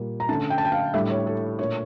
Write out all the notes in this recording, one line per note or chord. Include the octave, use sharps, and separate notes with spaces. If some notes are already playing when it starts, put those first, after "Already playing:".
Already playing: A#2 G3 A#3
A#5
D3 A3 C#4 A5
G5
A5
G5
F5
A2 G3 D4 E5
C#5
A4
A#2 A3 D4 C#5